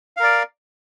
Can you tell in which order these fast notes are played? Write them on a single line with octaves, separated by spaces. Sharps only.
F5 A#4 D5